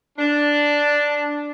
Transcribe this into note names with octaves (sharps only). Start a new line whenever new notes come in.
D4